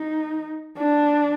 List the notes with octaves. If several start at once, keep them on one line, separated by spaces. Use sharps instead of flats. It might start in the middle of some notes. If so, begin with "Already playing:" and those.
Already playing: D#4
D4